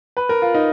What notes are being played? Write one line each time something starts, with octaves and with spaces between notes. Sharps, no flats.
B4
A#4
F4
D#4